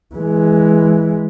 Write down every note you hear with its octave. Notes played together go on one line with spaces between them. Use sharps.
E3 G#3